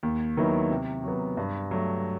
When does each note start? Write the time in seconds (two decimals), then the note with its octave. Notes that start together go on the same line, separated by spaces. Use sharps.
0.03 D#2
0.37 D#3 F#3 B3 E4
0.70 C3
1.04 F#3 B3
1.37 G2
1.71 F#3 A3